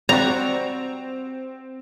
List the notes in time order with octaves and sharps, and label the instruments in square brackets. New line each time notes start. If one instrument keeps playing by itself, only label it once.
[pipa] G3 F#4 [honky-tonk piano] C4 [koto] A#5